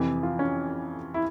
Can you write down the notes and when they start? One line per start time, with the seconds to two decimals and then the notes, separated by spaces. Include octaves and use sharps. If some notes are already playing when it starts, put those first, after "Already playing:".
Already playing: F2 C3 E3 G4
0.23 F4
0.39 C#4
1.14 E4